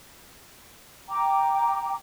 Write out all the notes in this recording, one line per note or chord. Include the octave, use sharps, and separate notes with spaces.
G5 A#5 D6